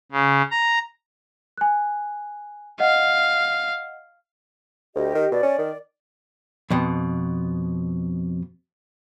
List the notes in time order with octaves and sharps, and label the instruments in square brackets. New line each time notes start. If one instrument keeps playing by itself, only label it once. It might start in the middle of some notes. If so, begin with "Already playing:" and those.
[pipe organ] C#3
A#5
[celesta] G#5 F#6
[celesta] D#5 F#5 [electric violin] F5
[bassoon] D2 [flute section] G4 D#5
[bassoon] D#3
[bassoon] B2 [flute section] D5
[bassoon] C#4
D#3
[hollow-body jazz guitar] F2 B2